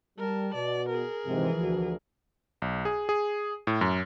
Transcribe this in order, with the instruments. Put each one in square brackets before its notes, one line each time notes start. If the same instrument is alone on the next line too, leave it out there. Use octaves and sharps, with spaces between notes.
[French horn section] G3 [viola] A#4 A5
[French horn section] B2 [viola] D5
[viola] G#4 A#4
[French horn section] G#2 C3 [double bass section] E3 F3
[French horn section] D2 F#4
[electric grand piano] B1
G#4
G#4
A2
F#2